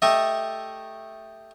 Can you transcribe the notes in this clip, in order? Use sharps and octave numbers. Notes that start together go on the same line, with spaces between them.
A3 G4 A4 D#5 E5